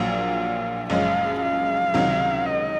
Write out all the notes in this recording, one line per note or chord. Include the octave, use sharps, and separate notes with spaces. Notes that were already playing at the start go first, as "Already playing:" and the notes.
Already playing: A#1 A#2 F#3 F5
F#1 F#2 F3 G#3 C#4 F5
F5
C#2 C3 D#3 F#3
D#5